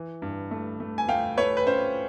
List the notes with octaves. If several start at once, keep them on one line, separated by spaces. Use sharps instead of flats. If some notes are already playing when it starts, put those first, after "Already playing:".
Already playing: E3
G2
A3
A3
G#5
A3 F5 G5
A3 B4 C#5
B4
C#4 C5